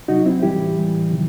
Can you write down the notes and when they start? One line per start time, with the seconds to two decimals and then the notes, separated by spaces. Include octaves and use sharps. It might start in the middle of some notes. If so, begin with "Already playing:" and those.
0.08 C3 F#3 D#4 F#4
0.25 C4 E4
0.42 A2 E3 G3 E4 G4
0.77 A2 E3 G3
1.11 C3 D#3 F#3